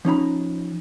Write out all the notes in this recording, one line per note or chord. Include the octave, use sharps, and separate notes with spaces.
F3 C#4 D#4 B5